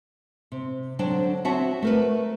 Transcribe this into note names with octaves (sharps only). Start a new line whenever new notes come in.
C3
D3 F#3 D4 C5 G5
C4 F#4 C#5 E5 F#5 A5
A3 A#4 B4